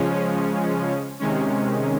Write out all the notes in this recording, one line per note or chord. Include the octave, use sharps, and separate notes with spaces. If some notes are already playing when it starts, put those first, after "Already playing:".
Already playing: C#3 F3 G#3 C#4
C3 D#3 G#3 C#4